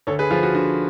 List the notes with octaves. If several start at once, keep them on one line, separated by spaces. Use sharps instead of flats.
D2 A4 C#5
G#4 B4
F3 F4 G#4
F#4
D3 F#4